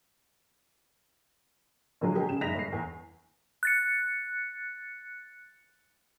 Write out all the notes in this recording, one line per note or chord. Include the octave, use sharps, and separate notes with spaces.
B2 D3 F3 F#3 G#3
G4 G#4
C#3 E7
F#1 G#3 D#4 A#6 B6 F7
G1 C7
E2
F#6 A6 C#7